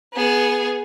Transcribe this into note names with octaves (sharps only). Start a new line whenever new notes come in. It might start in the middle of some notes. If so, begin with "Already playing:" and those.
B3 G#4